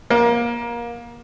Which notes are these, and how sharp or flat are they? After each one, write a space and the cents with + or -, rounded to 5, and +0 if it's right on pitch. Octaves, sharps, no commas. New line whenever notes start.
A#3 +25